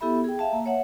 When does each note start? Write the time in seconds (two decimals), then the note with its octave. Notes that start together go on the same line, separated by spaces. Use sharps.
0.01 B3 E4 G4 A4 E5 B5
0.24 G#4 G5
0.39 E5 F5 A5
0.53 A#3
0.66 C#5 E5 F#5